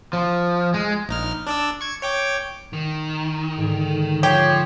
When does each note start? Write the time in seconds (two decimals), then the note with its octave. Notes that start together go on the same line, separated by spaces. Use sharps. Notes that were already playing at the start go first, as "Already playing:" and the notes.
0.13 F3
0.74 G#3
1.09 A#1 D#4 F6
1.47 D4 D5 E6
1.81 C#6 G#6
2.02 C#5 G5 D6
2.73 D#3
3.57 G#2 D3
4.23 F3 G4 C#5